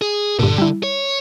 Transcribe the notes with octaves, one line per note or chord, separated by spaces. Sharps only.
G#4
G2 A#2 D3
G3 E4
C#5